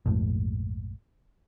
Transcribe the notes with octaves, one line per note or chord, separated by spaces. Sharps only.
A#1 F2 G#2 A3